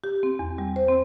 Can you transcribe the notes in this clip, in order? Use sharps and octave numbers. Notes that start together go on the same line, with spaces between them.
G4
C4
E2
G3
C5
C4